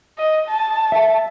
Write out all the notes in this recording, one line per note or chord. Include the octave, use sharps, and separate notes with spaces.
D#5
A5
E5